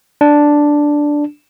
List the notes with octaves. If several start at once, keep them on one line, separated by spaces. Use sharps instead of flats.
D4